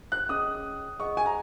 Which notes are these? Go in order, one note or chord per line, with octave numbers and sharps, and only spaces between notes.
F#6
C#4 G#4 D#5 D#6
G#4 D#5 F#5 C#6
G#5
A#5